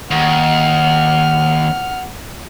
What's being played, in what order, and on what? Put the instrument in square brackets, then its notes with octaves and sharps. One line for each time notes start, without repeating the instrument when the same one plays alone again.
[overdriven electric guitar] D#2 [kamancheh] F#5 F6